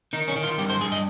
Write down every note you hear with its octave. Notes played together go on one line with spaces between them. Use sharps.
D#3 D#4
C#4
D#3
F4
G2 G4
C5
G2 G#4
D#5